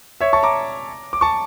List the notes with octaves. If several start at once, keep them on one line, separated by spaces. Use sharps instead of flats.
C#5 E5
A5 C#6
A#5 D6
D6
A5 C#6